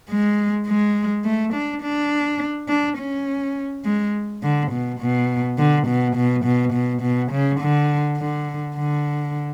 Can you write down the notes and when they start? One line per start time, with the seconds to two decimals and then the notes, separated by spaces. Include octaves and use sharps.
0.09 G#3
0.67 G#3
1.25 A3
1.54 D4
1.82 D4
2.68 D4
2.98 C#4
3.85 G#3
4.43 D3
4.72 B2
5.00 B2
5.58 D3
5.87 B2
6.16 B2
6.45 B2
6.73 B2
7.02 B2
7.32 C#3
7.60 D3
8.18 D3
8.76 D3